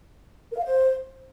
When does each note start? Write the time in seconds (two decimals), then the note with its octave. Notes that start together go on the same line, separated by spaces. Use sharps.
0.52 A#4
0.58 F5
0.65 C5